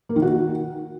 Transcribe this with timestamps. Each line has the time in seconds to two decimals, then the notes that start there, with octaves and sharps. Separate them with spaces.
0.09 A#3
0.16 D#3
0.22 F#4